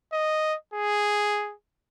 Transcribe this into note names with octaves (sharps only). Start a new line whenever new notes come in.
D#5
G#4